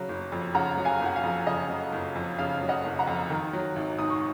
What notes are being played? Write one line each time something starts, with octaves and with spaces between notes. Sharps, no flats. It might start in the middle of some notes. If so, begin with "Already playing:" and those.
Already playing: C#3 F#3
F#1
F2
C#3 F#5 A#5
F#3
F5 G#5
F#1
F#5
F5
F2
C#3 D#5
F#3
F#1
F2
C#3 F5
F#3
D#5 F#5
F#1
F#5 A#5
F2
D#3
F#3
G#1
G#2 D#6
C#6